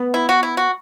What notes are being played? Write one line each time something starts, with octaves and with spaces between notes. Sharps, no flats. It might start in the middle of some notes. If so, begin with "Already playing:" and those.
Already playing: B3
E4
F#4
E4
F#4